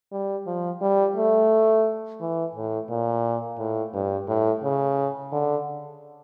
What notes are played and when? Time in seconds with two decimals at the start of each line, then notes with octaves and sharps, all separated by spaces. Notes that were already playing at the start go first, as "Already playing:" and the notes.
0.12 G3
0.47 F3
0.82 G3
1.16 A3
2.21 E3
2.55 A2
2.89 A#2
3.59 A2
3.93 G2
4.27 A2
4.63 C#3
5.32 D3